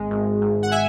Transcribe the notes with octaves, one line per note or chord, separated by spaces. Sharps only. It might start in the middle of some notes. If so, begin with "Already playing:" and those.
Already playing: G#1 G#3
G#1
G#1
F#5
E5 G#5